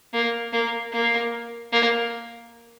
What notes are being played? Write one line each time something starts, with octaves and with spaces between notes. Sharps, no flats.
A#3
A#3
A#3
A#3